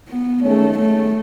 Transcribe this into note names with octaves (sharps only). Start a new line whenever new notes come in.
B3
D#3 G#3 A3 C#4 G#4 C#5
A3